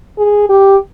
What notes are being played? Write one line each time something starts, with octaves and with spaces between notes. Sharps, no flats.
G#4
G4